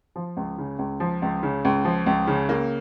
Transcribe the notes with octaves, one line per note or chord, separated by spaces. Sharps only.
F3
C#2
C#3
C#2
F3
C#2
C#3
C#2
F3
C#2
C#3
A#3